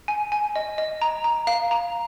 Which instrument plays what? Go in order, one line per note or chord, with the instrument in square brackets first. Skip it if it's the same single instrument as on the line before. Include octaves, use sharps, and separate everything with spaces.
[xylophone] G#5
G#5
D#5
D#5
A#5
A#5
F5
A#5